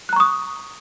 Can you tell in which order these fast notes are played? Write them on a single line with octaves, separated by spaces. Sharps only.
F#6 A#5 C#6 D#6